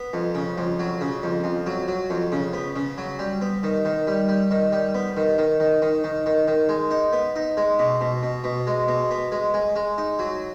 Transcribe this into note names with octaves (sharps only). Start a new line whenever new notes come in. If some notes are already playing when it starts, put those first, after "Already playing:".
Already playing: B3
F2
C#3
F2
F#3
C#3
F2
F2
F#3
F#3
F2
C#3
B3
C#3
F#3
G3
B3
D#3
D#3
G3
G3
D#3
G3
B3
D#3
D#3
D#3
D#3
D#3
D#3
D#3
G#3
D#4
B3
D#4
G#3
B2
B2
B2
B2
G#3
B2
B3
G#3
G#3
G#3
D#4
F#3